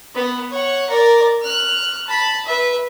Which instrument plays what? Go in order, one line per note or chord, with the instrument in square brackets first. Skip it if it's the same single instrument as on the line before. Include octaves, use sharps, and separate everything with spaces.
[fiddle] B3
C#5 F#5
A#4 D5
F6 F#6
A5 B5
B4 E5